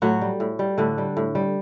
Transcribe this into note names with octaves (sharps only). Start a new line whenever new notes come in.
A2 F#3 F#4
G3
A2
G3
A2 D3 D4
G3
A2
G3